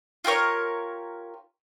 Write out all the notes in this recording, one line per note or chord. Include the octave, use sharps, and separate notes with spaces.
F4 G4 A#4 C#5